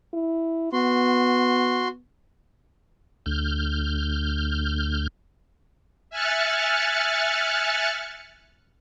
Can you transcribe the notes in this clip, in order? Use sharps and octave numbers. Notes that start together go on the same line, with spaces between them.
E4
B3 F#4 C6
D2 F6 G6
E5 G#5 F6 F#6 A6 C#7